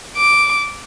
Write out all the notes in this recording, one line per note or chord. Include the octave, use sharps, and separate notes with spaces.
D6